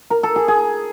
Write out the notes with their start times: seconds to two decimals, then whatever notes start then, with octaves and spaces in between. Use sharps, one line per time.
0.10 A#4
0.23 A4
0.36 G#4
0.48 G#4